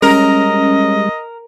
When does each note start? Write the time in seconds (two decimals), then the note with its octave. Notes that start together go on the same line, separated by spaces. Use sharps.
0.02 G3 G#3 C#4 A#4 D#5